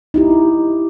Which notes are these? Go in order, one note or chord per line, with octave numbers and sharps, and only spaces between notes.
D#4 E4 G4